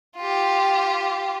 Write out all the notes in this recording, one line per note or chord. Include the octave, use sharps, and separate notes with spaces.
F4 G4